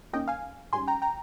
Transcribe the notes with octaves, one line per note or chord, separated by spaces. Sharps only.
D#2 D#3 A#3 C#4 D#5 G5
F5 G#5
G#2 G3 C#4 G#5 C6
G5 A#5
G5 A#5